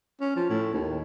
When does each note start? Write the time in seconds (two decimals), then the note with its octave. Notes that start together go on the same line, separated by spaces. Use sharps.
0.21 C#4
0.36 F3
0.50 A2
0.74 D#2